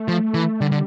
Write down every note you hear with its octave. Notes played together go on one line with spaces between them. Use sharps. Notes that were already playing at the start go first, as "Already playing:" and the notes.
Already playing: A3
F3
E3
D3 G3
D3